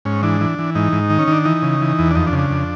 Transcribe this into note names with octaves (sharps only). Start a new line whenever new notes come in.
G#2 C#4
E3 D4
E3
E3
G#2 D#4
G#2
D#3
C#4
D#3 D4
E3 D#4
C#3
E3
E2
D4
F2 D#4
D4
C#3
D4
F2